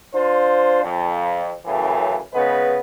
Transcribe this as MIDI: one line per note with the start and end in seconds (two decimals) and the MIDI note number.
0.13 0.83 62
0.13 0.83 65
0.13 0.83 72
0.84 1.53 41
1.65 2.19 42
1.65 2.19 45
1.65 2.19 49
1.65 2.19 52
2.32 2.80 49
2.32 2.80 56
2.32 2.80 59
2.32 2.80 71